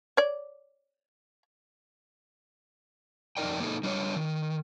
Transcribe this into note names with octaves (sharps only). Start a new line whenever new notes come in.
C#5 D5
F2 D#4 A#4 D5 G5
A#3 D#4 G#4 A4
G3 D4 F4 C#5
D#3